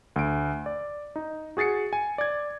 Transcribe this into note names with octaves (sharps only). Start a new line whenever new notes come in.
D2 D7
D5
D#4
F#4 G#4 A6 C7 C#7
G#5
D5 G#6